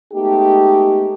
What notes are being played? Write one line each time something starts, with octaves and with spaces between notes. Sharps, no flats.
G#3 A3 B3 D#4 G4